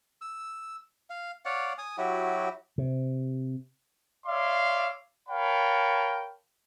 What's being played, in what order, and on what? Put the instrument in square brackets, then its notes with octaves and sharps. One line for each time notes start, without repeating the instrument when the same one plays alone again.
[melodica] E6
F5
C#5 D5 F5 F#5
G#5 D#6
F#3 E4 F#4 G4
[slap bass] C3
[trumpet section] C#5 D5 E5 F5 C6 D6
A#4 C#5 F5 G5 A5 B5